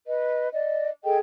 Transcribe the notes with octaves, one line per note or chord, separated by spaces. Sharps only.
B4 D#5
D5 D#5
G#4 A4 D#5 G5